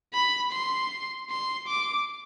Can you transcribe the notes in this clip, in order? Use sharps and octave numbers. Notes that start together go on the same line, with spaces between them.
B5
C6
C6
D6